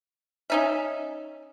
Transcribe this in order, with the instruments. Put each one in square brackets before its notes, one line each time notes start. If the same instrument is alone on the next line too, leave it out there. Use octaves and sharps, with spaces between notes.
[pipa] C#4 D#4 E5